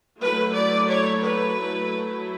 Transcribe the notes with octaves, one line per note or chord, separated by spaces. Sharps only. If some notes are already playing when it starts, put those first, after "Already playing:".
F#3 A3 E4 B4
D5
C#5
B4
F#3 A3 E4